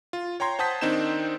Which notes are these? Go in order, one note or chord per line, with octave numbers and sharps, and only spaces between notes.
F4
C#5 G5 A#5 C6 G#6
C5 F#5 A5 D#6 G6 B6
D#3 C4 D4 D#4 G6 E7